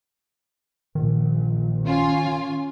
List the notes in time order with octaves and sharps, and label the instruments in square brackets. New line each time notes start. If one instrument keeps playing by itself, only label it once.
[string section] A#1 [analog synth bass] D#3
[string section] C#4 F4 G#5